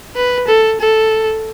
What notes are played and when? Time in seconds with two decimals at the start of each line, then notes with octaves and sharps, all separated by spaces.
0.16 B4
0.48 A4
0.81 A4